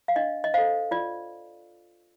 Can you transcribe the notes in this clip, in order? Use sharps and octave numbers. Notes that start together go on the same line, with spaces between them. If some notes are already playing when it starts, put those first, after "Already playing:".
F5
D4 D#5
D#5
A4 C5 F5
F4 D5